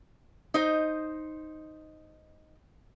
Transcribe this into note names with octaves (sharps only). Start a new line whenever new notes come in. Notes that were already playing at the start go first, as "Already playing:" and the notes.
D#4 C5 D#5